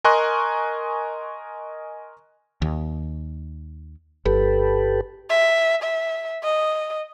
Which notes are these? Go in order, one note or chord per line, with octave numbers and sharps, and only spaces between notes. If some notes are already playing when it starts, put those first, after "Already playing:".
A#4 D#5 G#5 C6 C#6 F#6
D#2
G1 G4 A4 B4
E5
E5
D#5